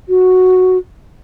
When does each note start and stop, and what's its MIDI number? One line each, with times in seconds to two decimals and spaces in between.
0.09 0.78 66